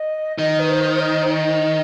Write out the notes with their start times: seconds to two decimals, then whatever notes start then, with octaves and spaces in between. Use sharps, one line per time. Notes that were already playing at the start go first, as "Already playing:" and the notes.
Already playing: D#5
0.38 D#3 D#5
0.59 B4
0.69 C5
0.94 C5
1.00 D#5
1.22 C5
1.30 D#5